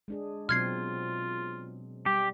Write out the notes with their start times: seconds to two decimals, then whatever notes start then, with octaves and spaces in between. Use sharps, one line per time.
0.08 G#3 D4 G#4
0.49 B2 F#3 C4 F4 F6 G#6 C7
2.06 G3 G4